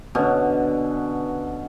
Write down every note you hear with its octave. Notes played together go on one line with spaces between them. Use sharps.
B2 D3 C#4